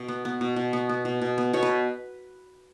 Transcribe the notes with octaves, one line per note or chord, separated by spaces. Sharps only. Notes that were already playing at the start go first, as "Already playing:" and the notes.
Already playing: B2 D#5
B3
B3
B2
B2
B3
B3
B2
B2
B3
B2 C#5
B4